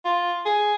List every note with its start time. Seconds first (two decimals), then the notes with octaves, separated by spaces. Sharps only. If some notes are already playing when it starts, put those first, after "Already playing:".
0.05 F4
0.46 G#4